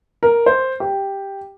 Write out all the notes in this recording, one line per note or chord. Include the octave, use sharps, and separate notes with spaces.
A#4
C5
G4